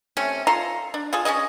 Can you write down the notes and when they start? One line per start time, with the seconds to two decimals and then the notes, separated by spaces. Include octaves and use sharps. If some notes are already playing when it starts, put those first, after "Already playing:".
0.17 C3 A3 C#4
0.47 F4 A4 A#5 C6
0.94 D4
1.13 F4 G#4 A4
1.25 C#4 D4 G#4 D#5